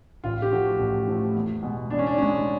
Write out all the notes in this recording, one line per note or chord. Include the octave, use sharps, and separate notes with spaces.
A1 F4
G4
A2 F3 A3 F#4
A1
A2 F3 A3
E2
B2 G#3
E2 D4
C#4
D4
B2 G#3 C#4